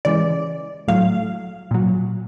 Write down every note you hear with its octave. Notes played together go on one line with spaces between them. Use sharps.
C#3 E3 G#3 D5
A2 F#3 F5
A#2 F#3